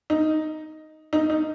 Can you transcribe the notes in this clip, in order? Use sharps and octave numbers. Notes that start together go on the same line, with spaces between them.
D#4
D#4
D#4